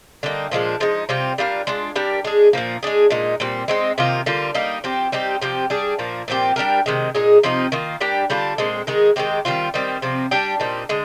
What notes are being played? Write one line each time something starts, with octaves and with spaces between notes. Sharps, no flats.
D3 G3 A#3 D#4
A#2 F3 G#3 D4
F3 G#3 D#4
C3 G3 C4 F4
G3 D4 F4 A#4
G#3 D4 F4
G3 D4 G4 A#4
G#3 D4 G#4
A#2 F3 A#3
G#3 D4 G#4
A#2 G#3 D#4
A#2 G3 C4
G#3 C4 D#4
C3 D#3 A#3 F4
D3 G3 A#3 F4
G3 A#3 D#4
F3 C4 G4
G3 C4 D#4 G4
C3 F3 C4 G4
G3 D4 G#4
A#2 F3 A#3
A#2 F3 C4 G4
G3 D4 G4 A#4
C3 D#3 G#3
A#2 G#3 D#4 G#4
C3 F3 C4 D#4
D#3 A#3 F4
G3 D4 G4 A#4
D3 G3 D4 F4
A#2 G#3 C4
D#3 G#3 D#4 G#4
D#3 G#3 C4 G4
D#3 G3 C4 F4
D#3 G3 C4
C3 F3 C4
G3 D4 G4
A#2 G3 C4 D#4
D3 G#3